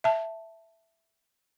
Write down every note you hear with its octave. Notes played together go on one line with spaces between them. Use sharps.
E5 A5